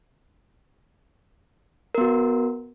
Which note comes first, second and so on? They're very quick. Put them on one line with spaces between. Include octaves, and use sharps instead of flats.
A#4 B3 F#4